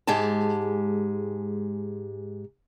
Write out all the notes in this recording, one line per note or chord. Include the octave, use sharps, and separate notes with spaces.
G#2 G#3 G4 G#5 A5